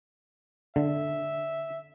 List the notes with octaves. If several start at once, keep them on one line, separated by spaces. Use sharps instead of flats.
D3 E5